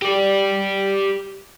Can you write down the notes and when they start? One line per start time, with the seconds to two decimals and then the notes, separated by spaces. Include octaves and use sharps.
0.02 G4 D5